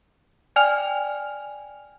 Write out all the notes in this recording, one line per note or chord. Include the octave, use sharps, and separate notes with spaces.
D5 G5 G#5 F6 F7